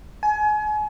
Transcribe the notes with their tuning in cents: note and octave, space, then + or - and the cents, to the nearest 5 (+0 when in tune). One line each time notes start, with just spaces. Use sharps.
G#5 +30